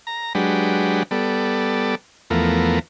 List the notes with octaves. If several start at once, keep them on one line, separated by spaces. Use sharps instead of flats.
A#5
F#3 G#3 D4 G4 B4
G3 B3 A4 D5
E2 F3 A3 B3 A#4